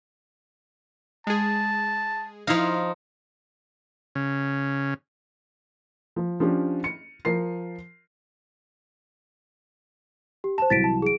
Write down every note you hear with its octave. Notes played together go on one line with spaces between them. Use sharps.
G#3 G#4 A5
F3 D#4 E4 F5
C#3
F3
F3 C#4 D4 G4
C#7
F3 A#4 C7
G4
C5 A5 E7
C2 E3 F#3 A6 B6 D7
A5
G#4 D7